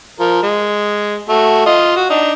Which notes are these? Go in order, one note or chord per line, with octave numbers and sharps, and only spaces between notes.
F3 A#4
G#3
A3 F#4
F4 D#5
F#4
D4 D#4